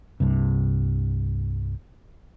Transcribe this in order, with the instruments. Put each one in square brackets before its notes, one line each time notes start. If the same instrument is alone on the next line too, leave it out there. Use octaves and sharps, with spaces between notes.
[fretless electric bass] C2 G2 C3